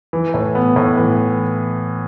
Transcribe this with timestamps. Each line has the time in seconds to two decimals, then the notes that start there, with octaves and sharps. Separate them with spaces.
0.13 E3
0.34 A2
0.55 B3
0.76 A2
0.97 E3